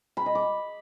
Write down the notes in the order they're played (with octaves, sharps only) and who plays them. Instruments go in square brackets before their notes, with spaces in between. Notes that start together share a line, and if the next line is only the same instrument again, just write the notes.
[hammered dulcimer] B5
D#5
D6